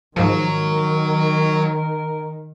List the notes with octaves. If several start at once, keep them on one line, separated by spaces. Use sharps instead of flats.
G#2 D#3 F3 F#3 A#4